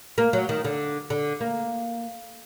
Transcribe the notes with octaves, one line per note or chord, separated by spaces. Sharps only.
A#3
F#3
D#3
D3
D3
A#3